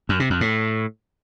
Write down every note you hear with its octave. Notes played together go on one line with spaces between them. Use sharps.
F#2
C3
F2
A2